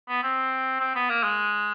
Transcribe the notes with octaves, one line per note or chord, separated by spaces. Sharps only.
B3
C4
C4
B3
A#3
G#3